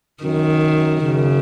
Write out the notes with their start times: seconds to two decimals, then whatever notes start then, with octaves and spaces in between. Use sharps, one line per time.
0.23 F#2 D#3
1.02 F#2 C#3